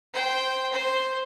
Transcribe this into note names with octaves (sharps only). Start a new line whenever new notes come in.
C5 G5
C5